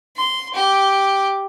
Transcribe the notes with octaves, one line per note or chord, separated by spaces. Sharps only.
C6
G4